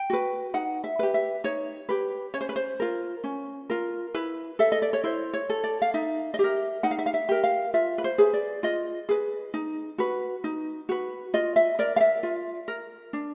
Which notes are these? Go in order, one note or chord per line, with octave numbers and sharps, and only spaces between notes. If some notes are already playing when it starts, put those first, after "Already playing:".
Already playing: G5
F#4 B4
D#4 F#5
E5
G4 B4
E5
D#4 C#5
G4 B4
C#4 C#5
C5
B4
C5
F4 A#4
C#4
F4 A#4
E4 B4
A4 E5
D#5
D5
C#5
E4 C5
C#5
A4
D5
F5
D#4 E5
D#5
G4 A#4 E5
D#4 F#5
F5
E5
F5
E5
G4 A#4
F5
F4 E5
B4
C5
G#4 B4
D5
F4 D#5
G#4 B4
D#4
F#4 B4
D#4
F#4 B4
F4 D#5
E5
A#4 D5
F5
E5
F4
A#4
D4